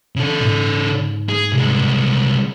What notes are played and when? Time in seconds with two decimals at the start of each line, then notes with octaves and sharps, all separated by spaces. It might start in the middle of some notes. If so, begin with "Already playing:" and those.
0.16 C#3 A4
0.41 G#2
1.29 G#4
1.53 C2 G#3